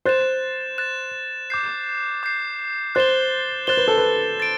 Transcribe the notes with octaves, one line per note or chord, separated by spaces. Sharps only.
C5 F#6 A6 E7
F#6 A6 E7
D6 G6 C7
D6 G6 C7
C5 F#6 A6 E7 G7
C5 F#6 A6 E7 G7
B4
A4
B4
A6 D7